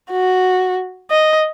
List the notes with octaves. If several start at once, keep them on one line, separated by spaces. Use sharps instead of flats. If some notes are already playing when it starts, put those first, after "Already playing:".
F#4
D#5